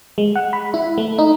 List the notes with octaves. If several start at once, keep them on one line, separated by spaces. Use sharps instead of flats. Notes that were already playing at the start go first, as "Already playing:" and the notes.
G#3
F#5
B5
E4
A3
D#4